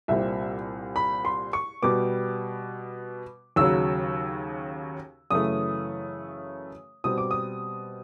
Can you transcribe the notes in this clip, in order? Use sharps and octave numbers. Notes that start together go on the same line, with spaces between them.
C2 A#2 G3 C4 E5
B5
C6
C#6
B2 G3 B3 D6
D#2 C#3 F#3 E6
F#2 C#3 E3 A3 D#6
B2 G3 C4 D#6
D6
D#6